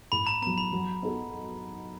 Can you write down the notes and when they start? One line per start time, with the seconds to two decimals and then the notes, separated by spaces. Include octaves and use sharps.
0.12 A2 B5
0.27 A#5
0.42 B3 A#5
0.47 F#3
0.58 B5
0.72 F#3
1.02 B3 D#4 F#4 A4